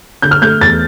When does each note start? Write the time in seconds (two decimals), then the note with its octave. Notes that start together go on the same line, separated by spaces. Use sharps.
0.22 D3 G6
0.31 F6
0.42 A3 G6
0.61 E2 A6